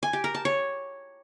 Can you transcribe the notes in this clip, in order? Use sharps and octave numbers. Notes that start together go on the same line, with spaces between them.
G#5
G4
A#4
A5
C#5